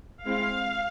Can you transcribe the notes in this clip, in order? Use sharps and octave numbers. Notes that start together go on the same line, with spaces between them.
G#3 C4 E4 F5